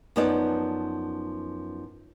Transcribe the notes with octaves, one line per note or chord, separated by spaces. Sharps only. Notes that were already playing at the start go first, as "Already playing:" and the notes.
F#2 F3 B3 D#4 D5 A5